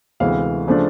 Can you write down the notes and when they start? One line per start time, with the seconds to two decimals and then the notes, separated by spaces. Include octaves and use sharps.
0.20 D2 C3 E3 G#3 B3 F5
0.68 C#3 F3 A3 D4